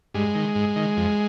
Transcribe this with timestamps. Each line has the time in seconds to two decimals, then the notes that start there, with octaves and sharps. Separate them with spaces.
0.14 G2 G#3
0.35 D#3
0.55 G#2
0.76 D#3
0.97 F2